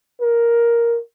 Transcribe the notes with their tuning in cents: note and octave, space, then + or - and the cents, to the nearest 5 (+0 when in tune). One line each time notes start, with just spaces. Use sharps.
A#4 +5